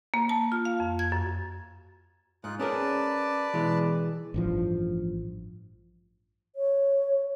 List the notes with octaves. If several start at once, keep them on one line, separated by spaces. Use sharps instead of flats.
A#3
A5
F4
F5
F2
G#6
F#2
G#2 D#4 F4 F#6
C#4 G#4 A#4 B4 D5 A5
B2 E3 G#3
A1 G2 F3
C#5